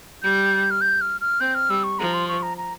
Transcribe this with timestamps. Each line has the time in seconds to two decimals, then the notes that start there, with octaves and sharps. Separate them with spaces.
0.23 G3 G6
0.71 F6
0.81 G6
1.01 F6
1.21 F6
1.40 C4 G6
1.55 F6
1.70 G3 E6
1.84 C#6
1.99 F3 A#5
2.14 C6
2.28 C#6
2.43 A#5
2.58 A#5